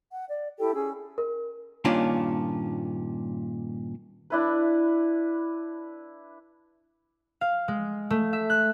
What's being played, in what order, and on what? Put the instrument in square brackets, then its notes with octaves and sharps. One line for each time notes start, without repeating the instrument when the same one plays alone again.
[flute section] F#5
D5
E4 G4 A4 G5
C#4 G#4 E6
[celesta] A#4
[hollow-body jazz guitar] G2 A#2 D#3 C#4 D4 F4
[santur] D4 E4 B4
[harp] F5
G#3
A3
E5
F#6